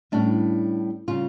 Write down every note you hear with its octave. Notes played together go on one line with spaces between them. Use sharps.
A2 G3 C#4 D4
C#3 G3 C#4 F4